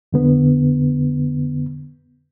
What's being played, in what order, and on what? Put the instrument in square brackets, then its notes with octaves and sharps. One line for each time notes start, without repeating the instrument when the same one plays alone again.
[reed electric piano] F2 D3 B3